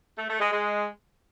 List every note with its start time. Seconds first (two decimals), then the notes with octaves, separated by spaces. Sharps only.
0.18 A3
0.29 A3
0.40 G#3
0.51 G#3